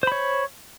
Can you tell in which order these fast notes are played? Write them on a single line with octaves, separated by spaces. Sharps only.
C5 B5 C#5